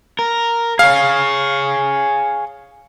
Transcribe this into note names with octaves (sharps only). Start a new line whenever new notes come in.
A#4
G#4 C#5 F5